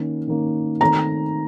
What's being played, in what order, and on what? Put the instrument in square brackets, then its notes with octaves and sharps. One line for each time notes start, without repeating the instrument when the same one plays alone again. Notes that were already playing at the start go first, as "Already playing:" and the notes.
Already playing: [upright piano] D#3 A#3 C#4
D#3 A#3 C#4
[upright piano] D#3 A3 C4 [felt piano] A#5